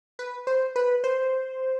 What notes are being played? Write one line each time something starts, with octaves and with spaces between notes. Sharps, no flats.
B4
C5
B4
C5